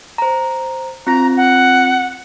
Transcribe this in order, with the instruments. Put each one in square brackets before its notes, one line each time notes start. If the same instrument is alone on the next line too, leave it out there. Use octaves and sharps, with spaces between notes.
[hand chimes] C5 A#5
[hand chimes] C4 F4 A#6 [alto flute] A#5
[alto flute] F#5